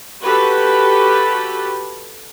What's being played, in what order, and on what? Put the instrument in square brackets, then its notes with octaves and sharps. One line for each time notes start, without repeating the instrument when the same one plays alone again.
[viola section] F#4 G4 A4 B4